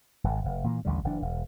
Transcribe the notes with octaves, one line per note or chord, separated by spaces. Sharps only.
D1 G#1
F1
A#2 E3 F#3 A#3
A1 D#2 D3 G3
F#1 E3 D4
E1